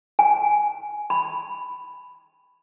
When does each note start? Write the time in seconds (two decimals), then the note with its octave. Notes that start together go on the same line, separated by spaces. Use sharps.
0.19 G#5
1.10 B5